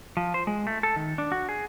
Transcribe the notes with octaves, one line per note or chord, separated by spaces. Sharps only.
F3
C5
G#3
A3
A4
D#3
D4
F#4
G#4